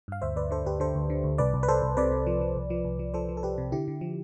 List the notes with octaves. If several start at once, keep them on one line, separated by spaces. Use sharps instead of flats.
G2 F5
D2 C5 E5
D2 B4 D5
D3 A4 C5
D2 G4 B4
D3 A4 C5
D2
D3
D2
C2 B4 D5
C2
B4
C2 A4 C5
C2
C3 B4 D5
C3
F3
F3
C2
F3
C2
F3
F3 A4 C5
F3
A4
C2 G4 B4
C3
D3 E4 G4
D3
F3